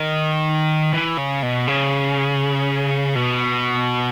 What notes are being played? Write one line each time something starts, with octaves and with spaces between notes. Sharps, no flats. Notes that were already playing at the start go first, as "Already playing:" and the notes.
Already playing: D#3
E3
C#3
B2
C#3
B2